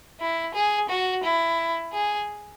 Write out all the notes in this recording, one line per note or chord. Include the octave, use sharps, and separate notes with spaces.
E4
G#4
F#4
E4
G#4